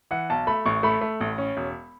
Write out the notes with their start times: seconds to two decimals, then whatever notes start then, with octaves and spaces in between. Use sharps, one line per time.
0.11 E3 F#5
0.30 B1 A5
0.47 A3 B5
0.66 A1 C#6
0.83 A3 B5
1.01 A3
1.21 A1
1.38 C#4
1.57 E1